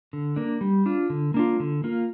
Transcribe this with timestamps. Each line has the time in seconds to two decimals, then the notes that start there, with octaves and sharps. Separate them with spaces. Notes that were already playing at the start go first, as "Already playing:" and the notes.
0.13 D3
0.36 A#3 D4
0.61 G3
0.86 D4 F4
1.10 D3
1.34 A#3 D4 F4
1.60 D3
1.84 A#3 F4